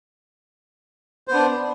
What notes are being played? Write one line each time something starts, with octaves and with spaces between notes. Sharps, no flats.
B3 D4 C5